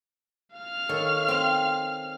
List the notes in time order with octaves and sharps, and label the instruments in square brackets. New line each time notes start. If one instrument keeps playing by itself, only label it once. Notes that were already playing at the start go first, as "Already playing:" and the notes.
[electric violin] F5 F6
[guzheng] D#3 A4 C#5
C4 C6